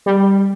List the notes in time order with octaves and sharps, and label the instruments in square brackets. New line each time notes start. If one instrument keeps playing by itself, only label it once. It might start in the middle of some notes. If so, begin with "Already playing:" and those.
[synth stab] G3